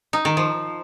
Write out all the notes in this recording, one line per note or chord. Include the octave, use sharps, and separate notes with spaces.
D#4
D#3
F3